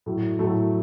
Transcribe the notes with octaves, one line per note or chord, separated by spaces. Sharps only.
A2 F#3
A2 F#3 A3